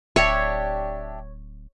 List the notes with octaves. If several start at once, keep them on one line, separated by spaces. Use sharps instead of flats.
D1 D4 G4 C#5 E5